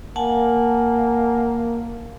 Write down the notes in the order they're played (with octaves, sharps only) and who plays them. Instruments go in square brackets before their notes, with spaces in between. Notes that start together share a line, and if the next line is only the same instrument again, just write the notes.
[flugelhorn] A#3 [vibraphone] F#5 G#5 A5